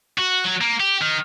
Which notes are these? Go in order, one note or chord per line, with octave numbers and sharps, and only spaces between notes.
F#4
F#3
A#3
G4
D#3